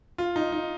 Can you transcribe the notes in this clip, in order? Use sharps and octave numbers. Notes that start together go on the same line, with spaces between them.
F4
D#4
D#4